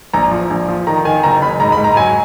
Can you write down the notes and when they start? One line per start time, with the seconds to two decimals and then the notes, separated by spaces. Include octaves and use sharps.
0.14 A#1 A#5
0.31 F3
0.50 A#1
0.69 F3
0.87 D#3 A#5
1.05 D#3 G#5
1.23 F#1 A#5
1.42 F#1 B5
1.60 G#2 A#5
1.72 B5
1.78 G#2
1.84 A#5
1.96 F#3 G#5